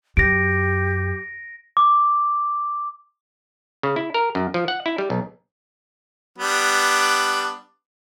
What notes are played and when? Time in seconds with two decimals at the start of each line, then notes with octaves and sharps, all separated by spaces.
0.17 F#2 G4 A#6 D7
1.77 D6
3.83 C#3
3.96 E4
4.14 A#4
4.35 F#2
4.54 F3
4.68 F#5
4.86 E4
4.98 G3
5.10 B1
6.38 G3 B3 D4